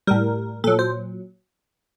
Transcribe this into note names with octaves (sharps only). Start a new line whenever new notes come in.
A2 G3 A#4
A#2 F#3 A4
C5